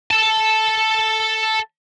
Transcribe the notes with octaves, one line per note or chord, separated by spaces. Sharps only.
A4 A5